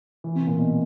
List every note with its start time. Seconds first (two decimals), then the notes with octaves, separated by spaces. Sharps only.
0.24 E3
0.35 C3
0.47 A#2
0.58 B2